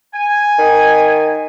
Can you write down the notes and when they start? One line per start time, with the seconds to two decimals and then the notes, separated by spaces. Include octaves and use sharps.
0.14 G#5
0.59 D#3